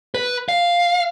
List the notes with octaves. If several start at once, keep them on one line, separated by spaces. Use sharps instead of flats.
B4
F5